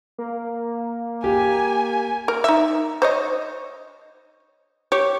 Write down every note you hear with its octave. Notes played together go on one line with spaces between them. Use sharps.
A#3
G4 G#5
A#4
D#4 E5
C5 C#5 D#5
G4 C#5